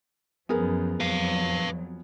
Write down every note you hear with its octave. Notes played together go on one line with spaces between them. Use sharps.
F#2 F3 B3 G#4 A#4
F2 F#3 B4 F5